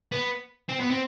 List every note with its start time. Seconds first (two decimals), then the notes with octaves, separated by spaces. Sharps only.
0.12 B3
0.69 C4
0.80 B3
0.91 C4